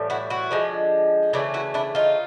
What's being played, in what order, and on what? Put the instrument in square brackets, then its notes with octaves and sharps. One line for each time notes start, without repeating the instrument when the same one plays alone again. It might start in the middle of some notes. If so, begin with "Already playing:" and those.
Already playing: [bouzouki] A2 E3 G3
E4 F#4
E4 F#4
D3 F3 G#3
C#3 E3 A3 D4 E4
E4 F#4
D4 E4
D#4 F4